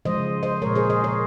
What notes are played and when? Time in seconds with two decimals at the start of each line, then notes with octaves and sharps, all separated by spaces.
0.05 C#3 F3 G#3 C5 D#5
0.43 C5 D#5
0.62 A#2 G#3 A#4 C#5
0.75 G#4 C5
0.90 C5 D#5
1.04 A#4 C#5